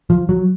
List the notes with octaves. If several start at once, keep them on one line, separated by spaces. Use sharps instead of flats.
F3
F#3